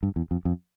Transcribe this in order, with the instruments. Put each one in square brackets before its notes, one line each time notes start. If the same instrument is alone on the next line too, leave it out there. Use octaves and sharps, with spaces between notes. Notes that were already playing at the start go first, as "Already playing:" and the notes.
[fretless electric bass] G2
E2
F2
F2